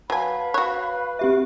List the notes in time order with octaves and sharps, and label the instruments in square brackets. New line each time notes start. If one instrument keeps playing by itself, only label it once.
[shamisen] F#3 G#5 [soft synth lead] B4 [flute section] F5 B5 [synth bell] A5
[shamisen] F#4 C#5 [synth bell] F#6
[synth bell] C4 G4 E5 [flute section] F#4